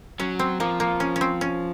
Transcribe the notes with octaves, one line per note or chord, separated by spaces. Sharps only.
F#3 C#4
C4
F3 A#3
A#3
C#4
C#4
C4
C#4